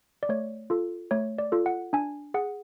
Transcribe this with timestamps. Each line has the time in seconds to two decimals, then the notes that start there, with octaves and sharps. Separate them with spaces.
0.23 D5
0.29 A3 C#5
0.70 F4 A4
1.11 A3 C#5
1.38 D5
1.52 F4 A4
1.66 F#5
1.93 D4 G#5
2.34 G#4 F#5